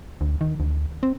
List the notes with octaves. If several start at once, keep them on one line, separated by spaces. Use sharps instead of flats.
D2
D#3
D2
C4